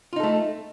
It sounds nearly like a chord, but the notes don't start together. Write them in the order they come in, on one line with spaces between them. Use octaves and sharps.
F4 D#4 A4 A3